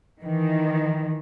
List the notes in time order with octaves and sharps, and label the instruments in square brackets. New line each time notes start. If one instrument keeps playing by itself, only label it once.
[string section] D#3 E3